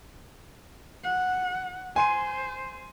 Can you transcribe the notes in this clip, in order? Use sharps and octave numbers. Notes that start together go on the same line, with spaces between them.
F#5
C5 G#5 C6 D#7